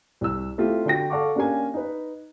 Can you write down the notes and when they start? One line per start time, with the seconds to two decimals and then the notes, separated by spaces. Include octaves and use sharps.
0.21 C2 E6
0.58 A3 C4 E4 F4 G4
0.86 D3 F#4 G5 A#6
1.10 A4 D5 F5 F#5 C#6 D6
1.35 A#3 C#4 D4 G4 F5 G#5
1.74 D#4 B4